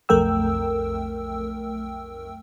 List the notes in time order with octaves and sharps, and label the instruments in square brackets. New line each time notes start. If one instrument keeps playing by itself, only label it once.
[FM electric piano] B1 F2 A3 A#4 G5 E6